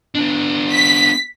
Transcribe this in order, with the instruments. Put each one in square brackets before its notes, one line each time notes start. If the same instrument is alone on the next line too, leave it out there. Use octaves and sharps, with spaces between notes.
[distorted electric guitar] B3 D4
[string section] B6